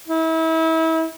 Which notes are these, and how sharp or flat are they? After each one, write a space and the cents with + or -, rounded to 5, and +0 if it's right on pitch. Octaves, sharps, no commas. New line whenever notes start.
E4 -35